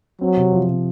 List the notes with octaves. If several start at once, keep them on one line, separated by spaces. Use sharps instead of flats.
F#3 C4
C3
F3
C3